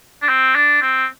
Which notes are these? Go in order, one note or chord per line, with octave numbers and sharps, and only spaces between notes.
D4
C4
D4
C4